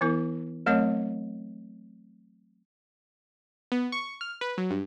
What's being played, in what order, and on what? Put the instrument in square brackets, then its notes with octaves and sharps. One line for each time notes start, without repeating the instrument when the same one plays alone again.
[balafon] E3 B3 E4 A#4
F#3 A3 C4 A#4 C#5 D#5
[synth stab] B3
C#6
F6
B4
F#3
G2